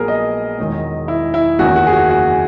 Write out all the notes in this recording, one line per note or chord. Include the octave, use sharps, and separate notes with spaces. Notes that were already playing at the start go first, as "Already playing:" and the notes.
Already playing: A#1 A#2 F#3 B3 G#4 A#4
D#5
E1 E2 D#3 F#3
E4
E4
F#1 E2 D#3 F#3 A#3 F#4
F#4
G#4
F#4
F#4